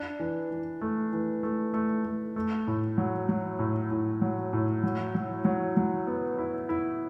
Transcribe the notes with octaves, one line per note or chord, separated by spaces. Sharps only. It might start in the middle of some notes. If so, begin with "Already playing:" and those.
Already playing: D4
E3
E3
A3
E3
A3
A3
A3
A3
A2
F#3
F#3
A2
A2
F#3
A2
F#3
F#3
F#3
F#3
B3
E4
E4